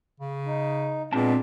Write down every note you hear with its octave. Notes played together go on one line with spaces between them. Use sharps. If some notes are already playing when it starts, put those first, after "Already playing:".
C#3
D#4
A#2 G#3 B3 C4 D4 A5